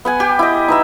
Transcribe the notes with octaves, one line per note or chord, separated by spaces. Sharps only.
B3 F#5 G#5
G4
E4 D#5
D#4 B4 E5